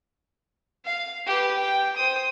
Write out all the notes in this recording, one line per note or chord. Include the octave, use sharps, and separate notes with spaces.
F5
G4 B4
G5
C5 D#6